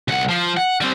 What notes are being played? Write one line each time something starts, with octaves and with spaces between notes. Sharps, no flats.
C2 F#5
F3
F#5
G3 C4